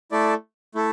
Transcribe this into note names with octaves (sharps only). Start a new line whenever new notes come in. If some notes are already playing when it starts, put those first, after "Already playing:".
A3 E4 A4 D5
A3 E4 A4